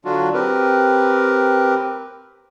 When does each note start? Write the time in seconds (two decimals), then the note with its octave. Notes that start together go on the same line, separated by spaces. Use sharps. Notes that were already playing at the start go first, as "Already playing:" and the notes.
0.05 D3 F#3 D4 F4 F#4
0.34 C4 G4 A#4 B4